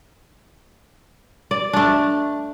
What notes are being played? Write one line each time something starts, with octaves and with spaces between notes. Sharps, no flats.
D5
A3 D4